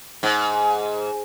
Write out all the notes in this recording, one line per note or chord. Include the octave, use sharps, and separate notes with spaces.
G#2